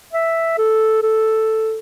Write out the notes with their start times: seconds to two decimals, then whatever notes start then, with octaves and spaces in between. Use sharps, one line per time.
0.13 E5
0.58 A4
1.02 A4